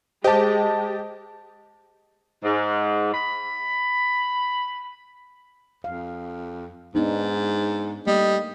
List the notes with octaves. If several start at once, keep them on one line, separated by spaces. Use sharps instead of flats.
G#3 G4 C5 D#5 A5
G#2
B5
F2 F5
G#2 B3 D4 D#4
G3 A3 A#3 D#5